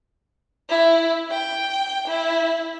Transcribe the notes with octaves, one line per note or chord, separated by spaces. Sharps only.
E4
G5
E4